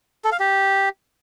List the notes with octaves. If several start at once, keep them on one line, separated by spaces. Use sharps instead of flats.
A4
F5
G4